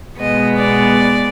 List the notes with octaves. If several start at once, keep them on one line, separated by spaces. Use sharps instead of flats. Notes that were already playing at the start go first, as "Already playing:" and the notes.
B2 G#3 B3 D#5
D5